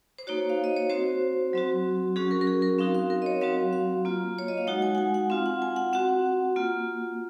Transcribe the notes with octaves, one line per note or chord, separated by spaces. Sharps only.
C5
A#3 D#4 F#4 C#5
F5
D#5
C#5
C4 F#4 C5
F#3 C4 F#4
F#3 C#4 F#4 G#4
A#4
A#4
G#4
A#4
C4 D#4 F#4 F5
F5
A#4
D#5
C#5
F#3 C4 F#4 F5
F5
A#3 F4
C#5
D#5
F5
G#3 D#4 F#4 F#5
G#5
F#5
G#5
F#5
C4 F4 F5
F#5
G#5
F#5
C4 F#4 F#5
A#3 F4